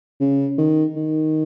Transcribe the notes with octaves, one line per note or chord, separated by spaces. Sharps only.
C#3
D#3
D#3